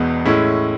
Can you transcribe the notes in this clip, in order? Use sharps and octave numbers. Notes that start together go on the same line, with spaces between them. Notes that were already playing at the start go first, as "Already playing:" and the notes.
Already playing: E1 E2 B2 G#3 B3
A2 G#3 C#4 E4